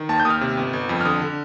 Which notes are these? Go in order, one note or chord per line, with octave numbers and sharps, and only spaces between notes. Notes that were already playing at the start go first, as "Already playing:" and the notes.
Already playing: D#3
D#2 A5
G6
D#2 D#6
F6
C3
G1
G1
F2
F6
D3 D#6
D3